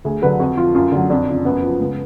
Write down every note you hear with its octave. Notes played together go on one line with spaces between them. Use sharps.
D2 G#4
D3 F#3 B4
F2 F#4
F3 F4
F#2 F4
D3 F#3
F2 D4
C#3 F3
F#2 B3
F3
C#2